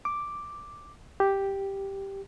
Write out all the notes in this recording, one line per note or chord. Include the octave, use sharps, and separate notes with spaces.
D6
G4